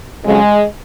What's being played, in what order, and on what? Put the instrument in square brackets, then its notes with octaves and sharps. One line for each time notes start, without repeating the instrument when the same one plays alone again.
[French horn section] F2 C#3 F#3 G#3